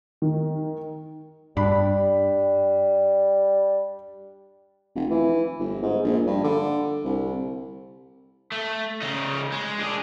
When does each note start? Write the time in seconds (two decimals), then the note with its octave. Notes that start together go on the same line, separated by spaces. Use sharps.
0.22 D#3
1.57 G2 G3 D4 B5
4.96 F1
5.10 E3
5.59 G1
5.83 G#2
6.04 A#1
6.27 G2
6.44 D3
7.05 C2
8.52 A3
9.02 C#3 D#4
9.52 G#3
9.79 D4 G#4